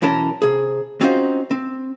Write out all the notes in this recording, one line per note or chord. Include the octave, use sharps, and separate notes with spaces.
B1 E3 C#4 A#4 A5
C3 G#4
C4 C#4 D#4 F4 F#4 C5
C4